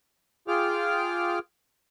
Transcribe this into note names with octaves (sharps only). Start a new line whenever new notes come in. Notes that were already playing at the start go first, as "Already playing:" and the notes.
F4 G#4 G5 D6 F6